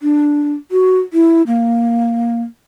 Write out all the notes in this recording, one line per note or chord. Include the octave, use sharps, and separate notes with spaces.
D4
F#4
E4
A#3